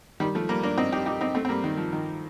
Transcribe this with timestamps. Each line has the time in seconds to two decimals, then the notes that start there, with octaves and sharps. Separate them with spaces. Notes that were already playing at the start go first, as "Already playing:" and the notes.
0.20 D#3 G3
0.35 F3 A3
0.49 G3 A#3
0.63 A#3 D4
0.78 C4 D#4
0.93 D#4 G4
1.06 D#4 G4
1.21 C4 D#4
1.35 A3 C4
1.45 C4
1.49 G3 A#3
1.64 D#3
1.77 F3
1.93 D#3